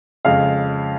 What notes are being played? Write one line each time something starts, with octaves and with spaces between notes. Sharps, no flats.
F2 C#3 G#3 F5